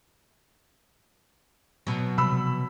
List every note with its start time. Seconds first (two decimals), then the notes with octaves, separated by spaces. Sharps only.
1.87 B2 F#3
2.18 C3 F3 G3 B5 E6